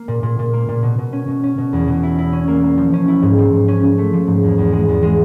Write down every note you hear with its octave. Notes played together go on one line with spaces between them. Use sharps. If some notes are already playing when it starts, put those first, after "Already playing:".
Already playing: A#3
A#2
A#2
A#2
A#3
A#2
B2
B2
C#4
B2
C#4
B2
E2
B2
E4
E4
C#4
A#3
A#3
F3
C#4
E4
G#2
F3
G#2
C#4
C#4
A3
F3
G#2
E2
E2
G#3
E2
G#3